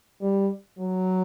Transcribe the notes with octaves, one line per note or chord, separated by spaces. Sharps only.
G3
F#3